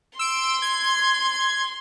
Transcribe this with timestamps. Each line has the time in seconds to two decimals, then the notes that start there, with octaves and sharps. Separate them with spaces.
0.19 C6 E6 D7
0.62 G#6